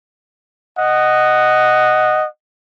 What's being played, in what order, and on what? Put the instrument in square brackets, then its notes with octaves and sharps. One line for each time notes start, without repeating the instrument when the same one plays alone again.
[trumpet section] D#5 F#5